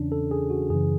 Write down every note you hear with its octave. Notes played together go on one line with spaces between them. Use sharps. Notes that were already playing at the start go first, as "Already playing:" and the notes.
Already playing: E2 C#3 E3 C#4 D4
A4
G#4
F#4
F#2 C#3 E3 G#4